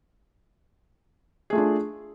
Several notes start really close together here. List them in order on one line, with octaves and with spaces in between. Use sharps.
G#4 A3 F4 D4